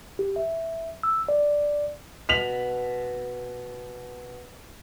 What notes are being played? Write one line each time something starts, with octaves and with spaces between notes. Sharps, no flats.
G4
E5
E6
D5
B2 B6 F7 F#7